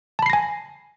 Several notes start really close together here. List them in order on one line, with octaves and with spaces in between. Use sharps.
A5 B5 C7 A#6 G#5